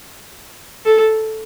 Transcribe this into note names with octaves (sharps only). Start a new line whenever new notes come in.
A4